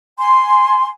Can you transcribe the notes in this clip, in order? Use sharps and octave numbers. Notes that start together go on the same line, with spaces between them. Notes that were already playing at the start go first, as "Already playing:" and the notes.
G#5 C6